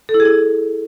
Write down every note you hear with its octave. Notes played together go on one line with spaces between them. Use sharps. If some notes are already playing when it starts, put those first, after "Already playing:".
A4
E4
G#4
E4